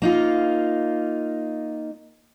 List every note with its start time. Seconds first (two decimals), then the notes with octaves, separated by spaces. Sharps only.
0.02 A#3 D#4 F4